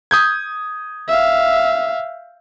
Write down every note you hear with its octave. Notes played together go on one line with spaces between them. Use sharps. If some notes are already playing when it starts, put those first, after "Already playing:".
D#6 G6 G#6
E5 F5